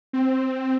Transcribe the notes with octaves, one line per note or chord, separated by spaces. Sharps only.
C4